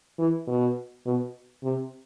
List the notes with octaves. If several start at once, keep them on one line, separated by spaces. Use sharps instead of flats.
E3
B2
B2
C3